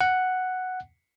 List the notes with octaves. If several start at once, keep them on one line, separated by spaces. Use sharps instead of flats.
F#5